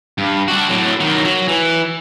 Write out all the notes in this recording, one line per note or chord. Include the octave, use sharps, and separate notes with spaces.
G2
D4 F#4
A2 F#3
D#3 F#3
F#3
E3